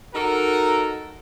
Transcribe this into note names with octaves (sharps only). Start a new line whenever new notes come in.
D#4 F#4 A4 A#4